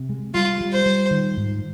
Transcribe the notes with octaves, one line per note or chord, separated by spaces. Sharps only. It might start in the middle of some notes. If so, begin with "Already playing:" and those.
Already playing: C3
G#3
G3 F4
G3
C5
G3
D#3
G#2